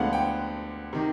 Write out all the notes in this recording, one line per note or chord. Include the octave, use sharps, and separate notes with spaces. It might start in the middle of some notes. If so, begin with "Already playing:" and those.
Already playing: D2 D3 F3 G#3 B3 F5 F#5
G5
C3 D#3